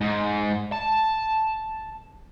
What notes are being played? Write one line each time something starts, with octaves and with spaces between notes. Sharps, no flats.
G#2
A5